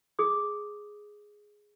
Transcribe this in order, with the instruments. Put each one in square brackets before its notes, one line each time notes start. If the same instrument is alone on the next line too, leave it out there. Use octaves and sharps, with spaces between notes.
[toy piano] G#4 D#6